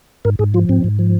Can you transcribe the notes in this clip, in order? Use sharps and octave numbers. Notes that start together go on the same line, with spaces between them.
G#2 A#4
G#2 G#4
F3 F4
G#2 C4
G#2
F3